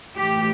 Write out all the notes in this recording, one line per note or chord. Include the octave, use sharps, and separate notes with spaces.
A2 E3 G4